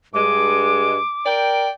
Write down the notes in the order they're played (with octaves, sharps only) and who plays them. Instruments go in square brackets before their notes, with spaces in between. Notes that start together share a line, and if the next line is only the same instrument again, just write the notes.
[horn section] G2 G#3 [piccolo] D6
[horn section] A#4 D5 G5